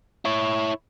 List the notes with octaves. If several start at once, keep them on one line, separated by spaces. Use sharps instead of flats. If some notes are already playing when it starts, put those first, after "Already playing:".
E4 C#5